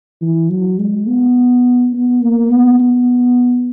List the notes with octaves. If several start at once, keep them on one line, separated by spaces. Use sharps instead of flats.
E3
F#3
G#3
B3
B3
A#3
B3
B3